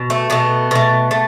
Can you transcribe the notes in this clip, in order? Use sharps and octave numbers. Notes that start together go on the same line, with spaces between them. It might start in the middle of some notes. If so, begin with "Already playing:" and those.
Already playing: B2
A3
B2 A3 B3
B2 A3
A3